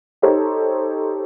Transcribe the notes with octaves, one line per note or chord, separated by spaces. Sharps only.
D#4 G4 A4 C5 C#5